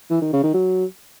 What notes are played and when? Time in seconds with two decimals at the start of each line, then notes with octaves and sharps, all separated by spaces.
0.10 E3
0.22 D#3
0.33 C#3
0.43 D#3
0.54 F#3